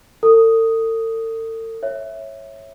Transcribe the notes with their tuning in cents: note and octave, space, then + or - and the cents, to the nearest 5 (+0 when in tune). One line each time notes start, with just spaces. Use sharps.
A4 +40 D#6 +0
C#5 -10 E5 +0